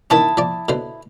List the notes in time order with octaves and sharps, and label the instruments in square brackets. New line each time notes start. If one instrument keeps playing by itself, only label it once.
[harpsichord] D#3 E3 C#4 [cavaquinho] E4 A5 D#6
[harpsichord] F3 D5
B2 D3 C5